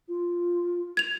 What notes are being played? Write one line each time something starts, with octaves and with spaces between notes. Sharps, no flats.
F4
G#6 F7